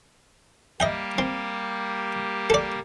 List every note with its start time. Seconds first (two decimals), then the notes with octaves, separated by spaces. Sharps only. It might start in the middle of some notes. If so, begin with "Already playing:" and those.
0.80 G3 A#3 G4 D#5 E5 G5
1.18 C4
2.50 A4 D5